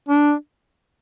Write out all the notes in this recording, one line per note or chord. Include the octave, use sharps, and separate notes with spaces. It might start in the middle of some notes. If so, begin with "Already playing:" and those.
D4